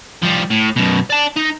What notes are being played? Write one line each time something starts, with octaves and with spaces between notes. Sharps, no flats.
F3 G3
A2
F#2 B2
D5 A5
D#4